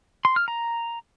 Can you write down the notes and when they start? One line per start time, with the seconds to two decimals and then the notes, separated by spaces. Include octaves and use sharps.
0.25 C6
0.36 F6
0.48 A#5